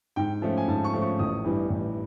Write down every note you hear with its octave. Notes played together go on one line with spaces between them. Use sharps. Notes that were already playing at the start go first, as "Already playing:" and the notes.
G#2 G5
F3 A3 C#4
G#5
G#2 A5
C#6
F3 A3 C#4
C#6
A1 D#6
G2 E3 G3
A1